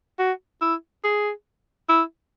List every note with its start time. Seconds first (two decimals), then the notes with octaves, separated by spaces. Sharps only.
0.19 F#4
0.61 E4
1.04 G#4
1.89 E4